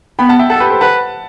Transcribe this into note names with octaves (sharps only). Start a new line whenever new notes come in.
B3 G5 B5
F#5 A5
E5 G5
A4 F#5 A5
G4 B4
A4 C5
B4 F#5 A5